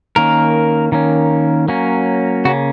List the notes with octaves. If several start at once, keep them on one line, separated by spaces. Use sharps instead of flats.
D#3 A#3 C#4 A#4
D#3 A#3 C#4
F#3 A#3 C#4
C#3 A#3 C#4 F#4